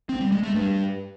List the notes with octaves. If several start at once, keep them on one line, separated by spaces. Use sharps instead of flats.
C4
G3
G#3
A3
G2